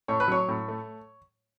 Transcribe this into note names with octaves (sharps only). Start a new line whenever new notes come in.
A2 C#5
B4
F#3 C#5
A2
A3